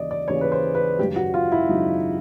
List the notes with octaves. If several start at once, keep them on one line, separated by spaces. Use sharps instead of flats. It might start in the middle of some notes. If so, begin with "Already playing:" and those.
Already playing: D#2 C#3 E3 D5 D#5
D5
D#2 C#3 E3 C#5
B4
C5
B4
G#1 F#2 C#3 F#3 G4
F#4
F4
E4
G#1 F#2 C#3 F#3 D#4